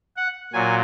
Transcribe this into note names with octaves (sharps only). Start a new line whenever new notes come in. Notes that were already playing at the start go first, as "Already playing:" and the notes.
F#5
A#2 F#3 G#5